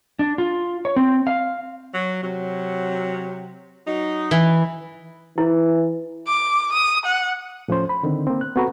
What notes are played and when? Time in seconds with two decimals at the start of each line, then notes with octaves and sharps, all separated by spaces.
0.19 D4
0.38 F4
0.85 C#5
0.96 C4
1.27 F5
1.94 F#3
2.22 C3 F#3
3.87 F#3 D#4
4.31 E3
5.38 E3 E4
6.28 D6
6.73 D#6
7.06 F#5
7.68 A2 F3 C#4 C5
7.89 B5
8.03 D3 D#3 C4
8.27 A#3 C4
8.41 F#6
8.56 B3 C4 F#4 A4 B4 A#5